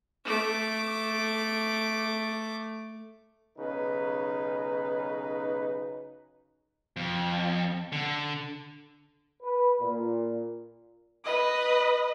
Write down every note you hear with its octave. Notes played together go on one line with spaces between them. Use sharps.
A3 D6
B1 C#3 D#4 B4
F2
D3
B4
A#2
B4 D#5